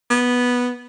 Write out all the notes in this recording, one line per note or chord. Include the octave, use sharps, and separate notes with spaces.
B3